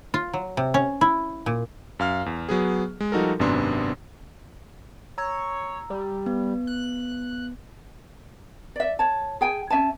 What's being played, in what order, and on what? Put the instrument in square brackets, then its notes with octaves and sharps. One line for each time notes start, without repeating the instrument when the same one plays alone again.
[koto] F4
F#3
C3
C#4
E4
A#2
[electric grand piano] F#2 F5 F6
E2
F#3 B3 G#4
G#3
F3 G3 D#4 F#4 A4 A#4
G#1 F#2 C3 B3 D4 C6
[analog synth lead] C#5 [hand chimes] A#5 E6
[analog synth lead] G3
[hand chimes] B3
[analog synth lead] F#6
[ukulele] D5 E5
C#5 A5
G#4 G5 G#5
C#4 E5 G#5 A5